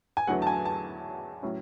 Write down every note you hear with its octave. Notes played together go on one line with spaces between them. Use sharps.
G#5
E2 D3 F#3 A3 E4 F#5
A5
G#5
A5
A2 F#3 C#4 E4